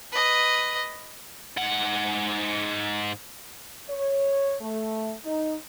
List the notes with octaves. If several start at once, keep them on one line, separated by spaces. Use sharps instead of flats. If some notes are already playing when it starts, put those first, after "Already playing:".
B4 D#5
G#2 F#5
C#5
A3
D#4